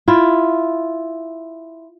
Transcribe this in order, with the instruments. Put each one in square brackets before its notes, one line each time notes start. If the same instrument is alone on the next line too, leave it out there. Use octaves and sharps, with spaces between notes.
[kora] E4 F4